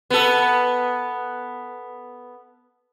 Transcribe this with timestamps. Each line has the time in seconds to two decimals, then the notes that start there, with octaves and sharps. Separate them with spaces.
0.10 B3 A4